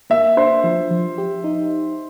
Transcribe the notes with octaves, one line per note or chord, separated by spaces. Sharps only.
A#3 E5
D4 C5
F3
F3
G4
D#4